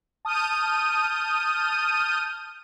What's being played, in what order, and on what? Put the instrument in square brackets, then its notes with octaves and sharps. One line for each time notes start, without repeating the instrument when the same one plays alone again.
[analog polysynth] A5 D#6 F6 G6 D#7